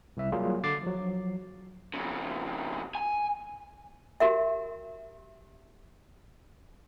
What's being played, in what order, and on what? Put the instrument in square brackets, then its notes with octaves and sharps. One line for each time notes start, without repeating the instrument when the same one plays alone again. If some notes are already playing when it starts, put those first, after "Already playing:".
[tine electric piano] C2 E5
F#3 G3 A#3 F4 G#4
D3 D6 A6 C7
F3 F#3
[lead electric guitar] F2 C#3
G#5
[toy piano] F#4 G4 A#4 E5